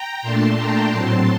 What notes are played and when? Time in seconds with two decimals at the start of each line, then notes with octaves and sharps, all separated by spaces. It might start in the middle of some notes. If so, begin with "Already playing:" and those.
Already playing: G5 A#5
0.22 A#2 A3 D4 A5 C6
0.56 G5 A#5
0.90 A2 F#3 C4 A5 C6